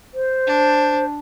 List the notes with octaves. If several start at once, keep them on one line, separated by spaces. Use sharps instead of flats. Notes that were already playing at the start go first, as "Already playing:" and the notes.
C5
D4